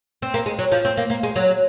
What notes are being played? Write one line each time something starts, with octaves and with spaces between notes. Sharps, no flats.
C4
A#3
G#3
F#3
F3
C4
A#3
A#3
G#3
F#3